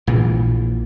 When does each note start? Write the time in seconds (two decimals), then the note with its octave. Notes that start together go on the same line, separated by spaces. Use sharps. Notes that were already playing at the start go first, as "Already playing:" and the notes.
0.07 A#1 A#2 E3